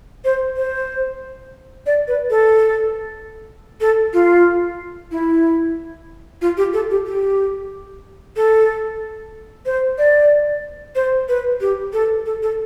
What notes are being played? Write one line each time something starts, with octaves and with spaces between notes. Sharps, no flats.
C5
C5
D5
B4
A4
A4
F4
E4
F4
G4
A4
G4
G4
A4
C5
D5
C5
B4
G4
A4
A4
A4